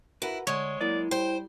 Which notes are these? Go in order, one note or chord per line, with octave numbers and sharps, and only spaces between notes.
E4 F#4 A#4 B4
D3 G#3 C#5
F#3 A#3 E4 D5 D#5
G3 C5 G5